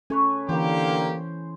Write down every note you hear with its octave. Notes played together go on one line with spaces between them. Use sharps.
C#4 A4 B4 C#5 G#5
D3 E3 A#3 G4 C5